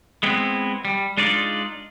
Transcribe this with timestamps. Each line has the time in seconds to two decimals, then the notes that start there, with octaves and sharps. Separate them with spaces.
0.23 G#3 B3 C4 E4
0.85 G3
1.17 G#3 D4 D#4 F4 D5